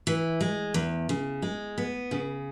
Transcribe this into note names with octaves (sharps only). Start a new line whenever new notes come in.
E3
G#3
E2
C#3
G#3
B3
C#3